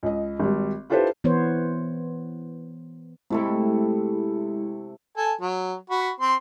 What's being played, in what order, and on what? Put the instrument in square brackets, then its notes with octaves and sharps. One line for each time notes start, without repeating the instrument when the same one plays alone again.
[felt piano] C#2 D#5
G#1 G3
E4 F4 G4 A4 B4 C5
[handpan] E3 B3 C5 C#5
[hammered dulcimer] C3 A3 A4 [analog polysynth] G#3 E4
[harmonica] A4 G#5
F#3
F#4 B5
C4 C6